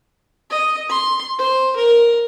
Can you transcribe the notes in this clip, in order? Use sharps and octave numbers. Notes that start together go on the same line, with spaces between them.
D#5
C6
C5
A#4